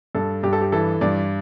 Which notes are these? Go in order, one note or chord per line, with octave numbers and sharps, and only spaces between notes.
G2 A4
G2 G4
A4
G4
E3 A4
G2 D5